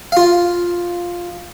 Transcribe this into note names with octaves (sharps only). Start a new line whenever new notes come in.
F4 F5